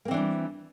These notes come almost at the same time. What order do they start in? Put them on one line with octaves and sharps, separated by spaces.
A#3 C4 E3 D4 G3